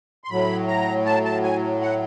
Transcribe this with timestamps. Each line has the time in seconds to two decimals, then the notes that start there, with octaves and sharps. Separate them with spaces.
0.24 C6
0.30 A2 F#3 B5
0.68 A#5
1.06 A5
1.25 A5
1.43 G#5
1.81 F#5